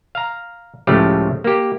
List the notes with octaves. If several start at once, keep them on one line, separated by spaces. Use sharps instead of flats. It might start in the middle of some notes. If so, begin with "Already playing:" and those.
F5 A#5
C#2 A2 C#3 F3 A3 G4
A#3 G4